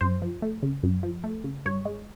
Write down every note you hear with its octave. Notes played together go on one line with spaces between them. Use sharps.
F#2 C5
F3
A3
C#3
F#2
F3
A3
C#3
G2 C#5
G#3